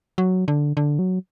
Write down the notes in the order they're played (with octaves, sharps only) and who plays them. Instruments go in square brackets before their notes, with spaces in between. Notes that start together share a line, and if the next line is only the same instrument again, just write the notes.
[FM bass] F#3
D3
D3
F#3